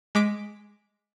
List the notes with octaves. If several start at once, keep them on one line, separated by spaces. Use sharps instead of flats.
G#3 D6 B6 D7